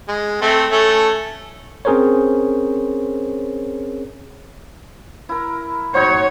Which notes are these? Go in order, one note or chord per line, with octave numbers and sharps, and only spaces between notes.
G#3
A3 C4
A3 C#4 A4
C4 C#4 G#4 A#4 C5 C#5
E4 A#4
D#4 F#4 C5 C#5